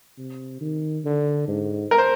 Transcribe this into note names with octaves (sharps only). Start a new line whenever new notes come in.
C3
D#3
D3
G#2
A#4
C5